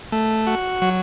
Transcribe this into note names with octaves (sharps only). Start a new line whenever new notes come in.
A3
F#4
F#3